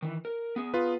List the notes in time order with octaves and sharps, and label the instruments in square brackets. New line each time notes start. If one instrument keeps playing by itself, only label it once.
[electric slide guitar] D#3 E3
A#4
B3 G#4
[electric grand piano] F4 B4